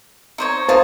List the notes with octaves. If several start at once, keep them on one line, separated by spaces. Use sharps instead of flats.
D#4 C5 C#5
D#4 F4 C5 A5